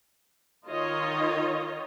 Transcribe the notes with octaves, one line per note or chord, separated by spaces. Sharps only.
D#3 D#4 F4 C#5 D#5